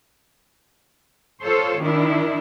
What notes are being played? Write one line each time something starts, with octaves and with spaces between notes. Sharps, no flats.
F4 A4 C5 C#5
D#3 D4 E4